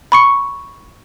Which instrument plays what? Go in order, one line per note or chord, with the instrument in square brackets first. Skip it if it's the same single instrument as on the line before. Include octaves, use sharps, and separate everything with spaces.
[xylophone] B5 C#6 C#7